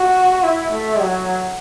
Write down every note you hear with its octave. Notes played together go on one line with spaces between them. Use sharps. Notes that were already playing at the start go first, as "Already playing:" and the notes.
Already playing: F#4
E4
A3
F#3